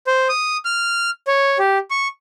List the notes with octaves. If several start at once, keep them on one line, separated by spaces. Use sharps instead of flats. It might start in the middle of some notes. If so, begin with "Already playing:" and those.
C5
D#6
F6
C#5
G4
C#6